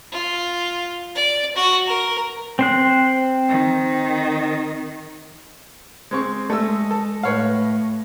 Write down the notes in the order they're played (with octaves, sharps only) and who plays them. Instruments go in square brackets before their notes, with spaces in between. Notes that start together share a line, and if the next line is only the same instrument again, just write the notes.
[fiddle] F4
D5
F#4
A#4
[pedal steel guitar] C4 C5 F#6
[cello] D#3
[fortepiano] G#3 C4 C#6
[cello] G#3 [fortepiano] A3 E6
[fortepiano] A4
[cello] A2 [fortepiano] B4 C#5 F5